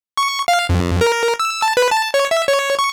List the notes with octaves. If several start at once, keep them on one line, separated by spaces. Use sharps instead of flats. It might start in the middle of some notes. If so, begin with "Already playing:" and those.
C#6
F5
F2
A#4
E6
A5
B4
A5
C#5
E5
C#5
C#6